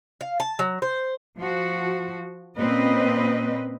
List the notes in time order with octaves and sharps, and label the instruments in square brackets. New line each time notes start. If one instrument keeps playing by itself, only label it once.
[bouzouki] F5
A5
F#3
C5
[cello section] F3 F#4
A#2 C4 C#4 B4 D#5